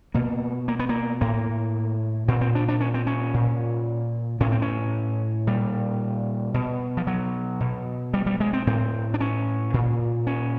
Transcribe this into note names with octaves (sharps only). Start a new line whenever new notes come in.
B2 A#3
A#3
B3
A#3
A2 A#3
A#2 C4
C4
D4
D4
C#4
C4
C#4
A#2
A2 C#4
C4
C#4
A#2 G3
B2
F3
F#3
B2
G3
G3
G#3
C4
A2 C4
D4
C#4
A#2
C#4